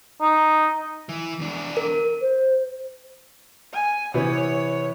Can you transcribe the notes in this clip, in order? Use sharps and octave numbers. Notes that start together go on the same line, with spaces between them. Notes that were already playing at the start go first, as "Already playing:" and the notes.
D#4
E3
E2 D4
A#4
C5
G#5
C3 E3 B3 C#5